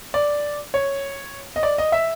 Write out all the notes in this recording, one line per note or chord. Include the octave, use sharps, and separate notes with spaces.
D5
C#5
D#5
D5
D#5
E5